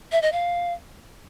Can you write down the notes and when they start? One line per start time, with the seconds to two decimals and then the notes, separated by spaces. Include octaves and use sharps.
0.12 E5
0.22 D#5
0.32 F5